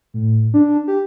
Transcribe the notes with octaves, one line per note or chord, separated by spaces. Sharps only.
A2
D4
G4